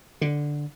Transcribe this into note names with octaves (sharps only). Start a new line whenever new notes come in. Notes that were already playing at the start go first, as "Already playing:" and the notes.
D3